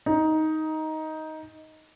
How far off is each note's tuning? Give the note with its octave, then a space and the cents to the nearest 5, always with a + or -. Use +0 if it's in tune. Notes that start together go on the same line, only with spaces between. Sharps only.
D#4 +10